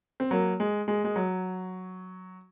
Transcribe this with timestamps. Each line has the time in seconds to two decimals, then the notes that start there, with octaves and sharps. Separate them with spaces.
0.20 C4
0.31 F#3 A#3
0.60 G#3
0.88 G#3
1.04 G#3
1.16 F#3